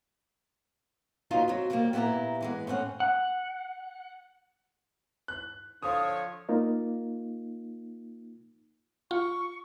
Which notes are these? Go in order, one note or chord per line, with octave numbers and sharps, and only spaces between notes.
D#2 F#3 D#4 F4 B4
F#3 C4
D#3 F3 G3 A3 A#3 G4
A#2 B3 E4 G4 G#5 A#5
E3 G#3 B3
A2 C4 C#4 F#5
F#5
F#6
D3 F3 C#5 D#6
A#3 D#4 F4
F4 C#6